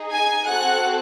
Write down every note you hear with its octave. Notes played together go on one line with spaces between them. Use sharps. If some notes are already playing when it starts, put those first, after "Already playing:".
Already playing: D#4 G#4
G#5 G#6
C4 F#4 A4 F#5 F#6